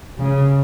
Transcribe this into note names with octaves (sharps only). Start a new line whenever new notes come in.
C#3